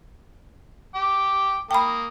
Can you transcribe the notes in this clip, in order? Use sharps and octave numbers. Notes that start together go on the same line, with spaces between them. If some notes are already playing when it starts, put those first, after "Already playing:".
G5 D6
A#3 G5 B5 D#6